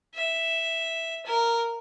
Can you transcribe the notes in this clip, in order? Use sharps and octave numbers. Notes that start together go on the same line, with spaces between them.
E5
A#4